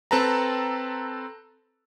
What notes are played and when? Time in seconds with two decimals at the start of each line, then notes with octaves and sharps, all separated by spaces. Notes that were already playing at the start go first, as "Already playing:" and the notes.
0.11 C4 A4 B4 A5 A#5